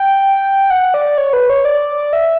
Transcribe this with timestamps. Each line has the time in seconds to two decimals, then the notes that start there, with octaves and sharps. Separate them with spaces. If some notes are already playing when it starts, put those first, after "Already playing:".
Already playing: G5
0.70 F#5
0.94 D5
1.18 C#5
1.33 B4
1.50 C#5
1.65 D5
2.13 E5